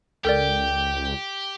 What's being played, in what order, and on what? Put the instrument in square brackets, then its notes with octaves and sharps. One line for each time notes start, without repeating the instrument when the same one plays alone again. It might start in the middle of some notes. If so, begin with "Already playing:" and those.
[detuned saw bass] C#2 [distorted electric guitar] G4 [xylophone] A4 A#4 D5 [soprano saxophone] G5